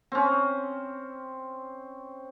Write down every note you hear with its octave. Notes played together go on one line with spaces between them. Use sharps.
C4 C#4